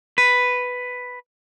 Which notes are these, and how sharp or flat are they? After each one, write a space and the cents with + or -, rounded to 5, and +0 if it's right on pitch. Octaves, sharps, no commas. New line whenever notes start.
B4 +5